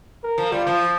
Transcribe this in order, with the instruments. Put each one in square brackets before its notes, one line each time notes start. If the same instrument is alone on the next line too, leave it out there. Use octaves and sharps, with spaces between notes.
[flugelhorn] A#4
[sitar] F3
[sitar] G3 [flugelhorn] F4
[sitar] F3